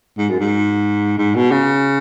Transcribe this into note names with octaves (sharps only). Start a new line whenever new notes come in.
G#2
F#2
G#2
G#2
B2
C#3